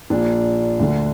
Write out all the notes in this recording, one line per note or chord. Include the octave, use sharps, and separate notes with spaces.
A#1 A#2 D4
D2 D3